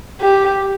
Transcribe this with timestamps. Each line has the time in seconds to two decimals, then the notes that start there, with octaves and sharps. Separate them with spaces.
0.21 G4